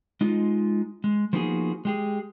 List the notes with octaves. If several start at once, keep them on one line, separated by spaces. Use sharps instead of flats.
G#3 D#4 F4
G#3
F3 A#3 B3 D#4 F#4 G#4
G#3 G4 G#4